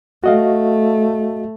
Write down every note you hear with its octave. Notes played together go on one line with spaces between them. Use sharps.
A3 F#4 D#5 F5